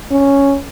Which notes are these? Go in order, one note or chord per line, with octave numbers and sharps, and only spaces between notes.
C#4